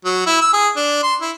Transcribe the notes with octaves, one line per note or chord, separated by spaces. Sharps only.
F#3
E4
E6
G#4
D4
C6
E4